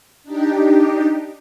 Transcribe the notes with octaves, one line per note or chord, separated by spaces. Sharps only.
D4 D#4 G4